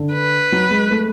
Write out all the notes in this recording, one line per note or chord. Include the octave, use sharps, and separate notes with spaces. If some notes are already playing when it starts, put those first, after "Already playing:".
Already playing: D3
B4
F#3
G#3
A3